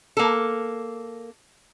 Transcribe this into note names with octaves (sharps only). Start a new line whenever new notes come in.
A#3 A4